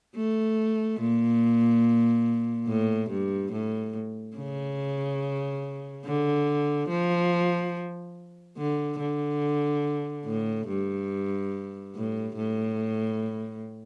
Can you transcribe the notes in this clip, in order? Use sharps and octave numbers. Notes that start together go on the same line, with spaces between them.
A3
A#2
A2
G2
A2
C#3
D3
F3
D3
D3
A2
G2
A2
A2